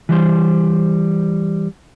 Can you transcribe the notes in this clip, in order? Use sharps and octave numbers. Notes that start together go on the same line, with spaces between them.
E3 G3 C5